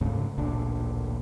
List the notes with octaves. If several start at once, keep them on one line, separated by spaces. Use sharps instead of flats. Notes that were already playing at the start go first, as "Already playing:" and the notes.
D2 G#2 C#3
A1 D2 A#2 D4